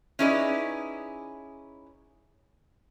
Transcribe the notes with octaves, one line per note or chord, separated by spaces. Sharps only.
C#4 D#4 E4 G#4 B4 D5